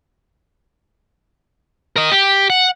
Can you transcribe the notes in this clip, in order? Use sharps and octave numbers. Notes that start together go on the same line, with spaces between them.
A#4 D#5
G4
F#5